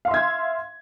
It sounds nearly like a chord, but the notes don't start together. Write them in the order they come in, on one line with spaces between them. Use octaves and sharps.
F5 C6 E5 G#6